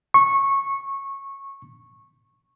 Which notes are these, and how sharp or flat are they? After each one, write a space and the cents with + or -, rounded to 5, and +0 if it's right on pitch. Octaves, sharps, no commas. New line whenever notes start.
C#6 -15